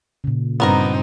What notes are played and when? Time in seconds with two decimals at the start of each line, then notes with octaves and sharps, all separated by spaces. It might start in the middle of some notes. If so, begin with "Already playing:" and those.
0.24 A#2 C#3
0.60 G2 B3 C4 D#4 A#4 A#5